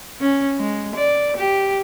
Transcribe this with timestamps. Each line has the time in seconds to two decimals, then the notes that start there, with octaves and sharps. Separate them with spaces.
0.21 C#4
0.59 G#3
0.96 D5
1.37 G4